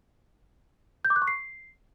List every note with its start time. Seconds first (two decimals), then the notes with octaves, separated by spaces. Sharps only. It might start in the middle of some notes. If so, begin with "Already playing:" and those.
1.05 G6
1.10 D6
1.16 F#6
1.22 C#6
1.27 C7